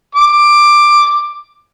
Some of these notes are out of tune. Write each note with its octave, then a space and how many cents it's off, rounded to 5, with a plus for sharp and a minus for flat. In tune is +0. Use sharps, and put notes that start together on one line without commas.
D6 +10